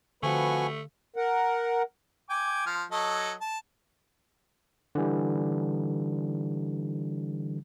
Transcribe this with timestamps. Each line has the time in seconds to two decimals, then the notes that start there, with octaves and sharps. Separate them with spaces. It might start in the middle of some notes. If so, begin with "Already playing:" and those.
0.23 D3 F3 A3 C4 F#4 B4 G#5 C#6
1.16 A#4 F#5
2.30 G5 G#5 D6
2.66 F3 F6
2.92 F#3 A4 D#5
3.41 A5
4.95 D3 E3 G3